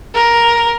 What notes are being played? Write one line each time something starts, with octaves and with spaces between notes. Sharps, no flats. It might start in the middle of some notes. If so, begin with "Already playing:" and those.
A#4